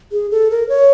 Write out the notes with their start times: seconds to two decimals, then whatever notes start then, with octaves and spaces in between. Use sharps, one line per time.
0.12 G#4
0.31 A4
0.50 A#4
0.69 C#5